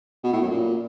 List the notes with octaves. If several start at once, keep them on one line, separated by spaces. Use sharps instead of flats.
B2
A2
F#2
A#2